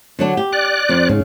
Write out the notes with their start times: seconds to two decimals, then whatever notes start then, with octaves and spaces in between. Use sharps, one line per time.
0.19 D3 F#3 D4
0.37 G4
0.53 D5 F#6
0.89 F2
1.09 G#2 C#3